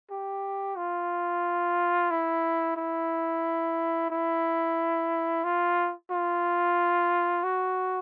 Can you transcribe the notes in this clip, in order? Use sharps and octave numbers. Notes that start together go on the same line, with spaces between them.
G4
F4
E4
E4
E4
F4
F4
F#4